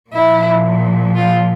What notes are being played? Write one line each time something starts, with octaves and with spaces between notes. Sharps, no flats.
A#2 F3 E4
F4